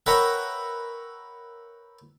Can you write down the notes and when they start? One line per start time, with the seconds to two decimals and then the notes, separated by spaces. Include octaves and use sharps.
0.06 A#4 B4 C#5 E5 F#5 G5